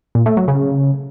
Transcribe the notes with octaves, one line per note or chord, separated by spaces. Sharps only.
A#2
A3
F#3
C#3